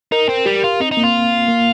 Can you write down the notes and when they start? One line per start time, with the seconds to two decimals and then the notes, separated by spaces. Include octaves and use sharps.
0.12 D#4 A#4
0.29 C4
0.46 G3 G4
0.64 F4
0.80 C4 D#4
0.91 D#4
0.97 A#3
1.03 F4
1.48 A#3